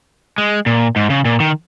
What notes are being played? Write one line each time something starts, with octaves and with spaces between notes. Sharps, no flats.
G#3
A#2
G#2
C#3
A#2
D#3